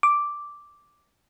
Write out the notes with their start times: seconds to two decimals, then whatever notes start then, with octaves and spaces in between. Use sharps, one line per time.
0.03 D6